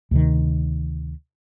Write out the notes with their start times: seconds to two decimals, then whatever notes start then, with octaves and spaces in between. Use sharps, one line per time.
0.11 D2 C3 D#3